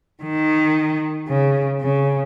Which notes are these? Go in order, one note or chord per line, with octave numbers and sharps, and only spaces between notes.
D#3
C#3
C#3